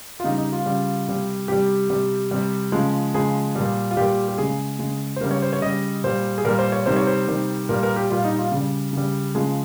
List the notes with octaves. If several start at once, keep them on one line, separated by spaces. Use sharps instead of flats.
F4
C#3 G3 D#4
D#4
F4
C#3 G3
C3 G3
C3 G3 G4
C3 G3
C3 G3
C#3 F3 G#3
C#3 F3 G#3 G#4
A#2 G3
F4
A#2 G3 G4
G4
C#3 G#3 G#4
C#3 G#3
C5
C#3 G3 A#4
C#5
C5
C#5
C#3 G3 D#5
A#2 G3 C5
G#4
A#2 G3 A#4
C5
C#5
C3 D#3 G3 C5
C#5
C5
C3 D#3 G3
A#2 G3 A#4
A#4
G4
A#2 G3 F4
D#4
F4
C#3 G3
C#3 G3
C#3 F3 G#3 G#4